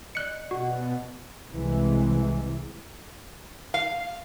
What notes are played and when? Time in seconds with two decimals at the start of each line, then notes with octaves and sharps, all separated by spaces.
0.15 D5 D#5 F#6 C#7
0.51 B2 F#4 F#5
1.51 C2 C3 E3 G#3
3.74 F5